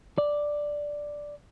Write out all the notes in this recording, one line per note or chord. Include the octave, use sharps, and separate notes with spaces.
D5